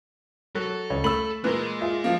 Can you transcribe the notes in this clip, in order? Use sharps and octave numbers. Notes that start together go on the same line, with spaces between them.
F#3 A4
C#2 C#5
A3 B5 E6 F#7
A#2 E3 G#3 A#4 B4
F4 G#4 E5
F3 A#3